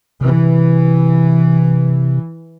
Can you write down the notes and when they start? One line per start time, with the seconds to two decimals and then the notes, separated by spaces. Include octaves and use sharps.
0.21 C3 E3